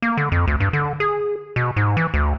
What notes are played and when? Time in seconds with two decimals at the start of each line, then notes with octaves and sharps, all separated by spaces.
0.02 A#3
0.17 D3
0.32 F2
0.47 D2
0.60 G2
0.73 D3
1.00 G#4
1.56 B2
1.76 G#2
1.97 E3
2.14 D2